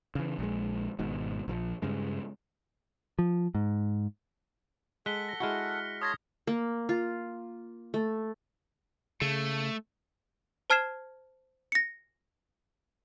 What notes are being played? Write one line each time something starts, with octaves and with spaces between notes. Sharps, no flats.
C#3 E3
A#1 G#3
G#1 G#2 B2
A#1 E3 F3
G2 C#3 G#3
F3
G#2
G#3 A4 F#5 F#6 B6 G7
A#6
G#3 E4 F#4 F6 C#7
C#5 A5 C6 D#6 G#6 A#6
A#3
F4
A3
C#3 A3
C5 A5 F6 G#6 C7 E7
A#6 C#7